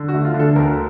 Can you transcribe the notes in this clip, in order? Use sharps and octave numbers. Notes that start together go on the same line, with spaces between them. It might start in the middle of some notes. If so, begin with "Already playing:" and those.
Already playing: D3
F#4
A3
F4
D3
A4
D2 A#4